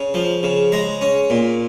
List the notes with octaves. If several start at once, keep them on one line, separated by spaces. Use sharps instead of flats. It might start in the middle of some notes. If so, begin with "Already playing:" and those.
Already playing: C#3
F3
C#3
G#3 A#5
C#4
A#2